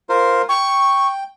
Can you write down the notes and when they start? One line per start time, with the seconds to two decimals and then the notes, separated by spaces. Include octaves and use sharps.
0.09 F4 A#4 C5
0.49 G5 C#6